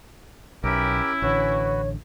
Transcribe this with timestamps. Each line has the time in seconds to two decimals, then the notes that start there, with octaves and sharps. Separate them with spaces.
0.64 B1 C#4 E4 G4 A#4 G5
1.22 A1 D3 F#4 B4 C#5